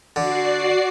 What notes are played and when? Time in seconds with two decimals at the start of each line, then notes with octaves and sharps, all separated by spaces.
0.16 D3 F#4 D5 C7